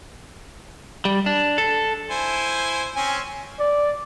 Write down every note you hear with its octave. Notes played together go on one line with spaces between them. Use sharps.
G3
D4
A4
E4 C5 G#5
C4 C#4 G#5
D5